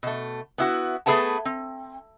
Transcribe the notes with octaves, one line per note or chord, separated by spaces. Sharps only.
B2 A3
B3 E4 F#4
A3 B3 G#4 B4 F#5 A5
C4